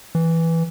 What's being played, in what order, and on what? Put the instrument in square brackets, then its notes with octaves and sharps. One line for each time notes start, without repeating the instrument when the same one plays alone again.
[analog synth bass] E3